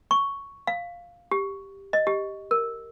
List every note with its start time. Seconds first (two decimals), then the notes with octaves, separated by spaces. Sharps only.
0.11 C#6
0.67 F5
1.32 G4
1.93 D#5
2.07 G4
2.51 A#4